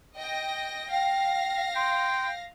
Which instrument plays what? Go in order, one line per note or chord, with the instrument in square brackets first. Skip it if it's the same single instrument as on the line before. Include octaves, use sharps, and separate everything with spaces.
[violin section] D#5 G5 A#6
[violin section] F5 A#6 [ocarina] G5
[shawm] G5 [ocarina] C6